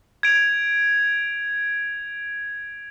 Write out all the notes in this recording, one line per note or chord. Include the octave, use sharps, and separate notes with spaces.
G#6 D7 F7